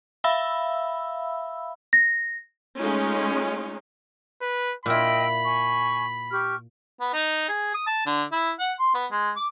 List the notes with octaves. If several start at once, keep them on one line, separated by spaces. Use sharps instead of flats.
E5 F5 B5 E6
A#6
G#3 A3 C#4 D#4 F4
B4
A#2 E4 D#5 G5 B5 E6
G#5 C#6
G4 C#6 F6
B3
D#4
G#4
D#6
A5
D3
E4
F#5
C6
B3
G#3
D6